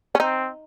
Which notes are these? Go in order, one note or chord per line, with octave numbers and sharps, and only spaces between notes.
C#4
C4 D#4